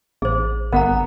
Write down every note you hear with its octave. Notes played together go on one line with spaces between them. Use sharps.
A1 G#4 C5
G1 B3 A#4 F#5 A#5